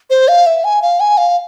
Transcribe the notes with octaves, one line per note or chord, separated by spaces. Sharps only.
C5
F5
E5
G#5
F5
G#5
F5